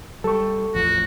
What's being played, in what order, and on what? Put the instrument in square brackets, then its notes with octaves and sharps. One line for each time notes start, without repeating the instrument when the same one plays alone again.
[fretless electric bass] G3 [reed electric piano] A4 C#6
[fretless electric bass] A1 E2 F3 [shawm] F#4